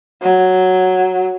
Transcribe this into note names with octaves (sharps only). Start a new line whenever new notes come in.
F#3